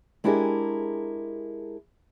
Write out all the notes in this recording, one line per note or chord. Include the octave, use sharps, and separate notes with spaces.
G#3 D4 E4 G4 G#4 A#4